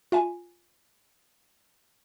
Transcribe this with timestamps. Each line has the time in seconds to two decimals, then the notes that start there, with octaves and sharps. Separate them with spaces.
0.12 F4 E5 G#5